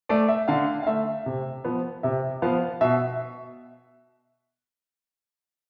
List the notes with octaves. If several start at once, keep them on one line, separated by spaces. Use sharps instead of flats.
A3 D5
E5
D3 F5
F5
A3 E5
C3
F3 B3
C3 E5
F3 B3 F5
B2 E5